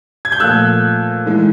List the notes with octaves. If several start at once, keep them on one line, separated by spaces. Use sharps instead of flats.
G#6
G6
A#2 F3 A3 E6 F#6
G#2 E3 G#3